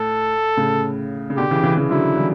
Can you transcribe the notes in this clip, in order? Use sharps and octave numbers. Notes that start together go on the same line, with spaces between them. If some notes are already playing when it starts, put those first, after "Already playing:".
Already playing: A2 A4
A2 C#3
C#3
B2 D3 G4
C#3 E3
C#3 E3
C#3 E3
D3 F#3 E4
E3 G3